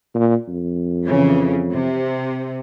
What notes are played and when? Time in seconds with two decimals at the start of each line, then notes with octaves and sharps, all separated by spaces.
0.15 A#2
0.48 F2
1.06 C#3 E3
1.71 C3